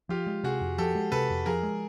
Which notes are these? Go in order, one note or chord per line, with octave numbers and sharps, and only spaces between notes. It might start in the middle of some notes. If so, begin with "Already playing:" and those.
F3 F4 G4
G#3
C3 F#4 G#4
F2
F3 G4 A4
G#3
C3 A4 B4
F2
F3 G#4 A#4
G#3